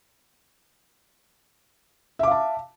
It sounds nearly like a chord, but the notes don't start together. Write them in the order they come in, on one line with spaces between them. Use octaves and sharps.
E5 D6 F5 A5